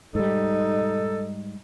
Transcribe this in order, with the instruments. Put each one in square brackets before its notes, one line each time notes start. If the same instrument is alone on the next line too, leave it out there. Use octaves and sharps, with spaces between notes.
[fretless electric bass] G#2 G3 [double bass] D#4 [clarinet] A4